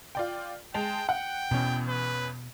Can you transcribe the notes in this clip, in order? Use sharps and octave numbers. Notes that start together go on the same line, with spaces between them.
F4 D5 G5
G#3 G5 A5 F7
F#5 G5
E2 B2 C#4
B4